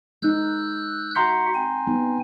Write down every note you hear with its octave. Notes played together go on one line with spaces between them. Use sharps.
G#3 D#4 E6 F#6 G6
F#4 E5 F#5 A#5 C6 G6
C4 G#5
G3 B3 D#4